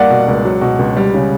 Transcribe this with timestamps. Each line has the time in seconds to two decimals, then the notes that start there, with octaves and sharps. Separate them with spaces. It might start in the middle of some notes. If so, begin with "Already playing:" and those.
Already playing: G2 A#3 D5 F#5
0.10 B2
0.28 C#2
0.45 F#3
0.61 B2
0.79 C#2
0.97 G3
1.14 C#3